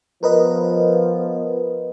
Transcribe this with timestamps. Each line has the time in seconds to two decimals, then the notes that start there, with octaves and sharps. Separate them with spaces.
0.23 F3 B3 A#4 B4 D#5